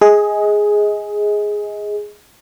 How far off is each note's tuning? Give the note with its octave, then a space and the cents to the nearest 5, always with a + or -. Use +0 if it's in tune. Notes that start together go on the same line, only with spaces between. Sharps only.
G#4 +0 D#5 +25